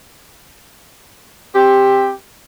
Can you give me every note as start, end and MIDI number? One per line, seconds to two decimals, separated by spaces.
1.55 2.11 60
1.55 2.11 67